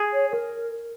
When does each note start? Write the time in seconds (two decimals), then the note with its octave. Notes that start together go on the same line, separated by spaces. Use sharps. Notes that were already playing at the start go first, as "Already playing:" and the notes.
Already playing: G#4
0.13 C#5
0.31 A#4